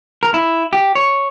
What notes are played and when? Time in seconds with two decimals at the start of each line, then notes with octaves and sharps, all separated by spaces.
0.23 A#4
0.34 E4
0.73 G4
0.95 C#5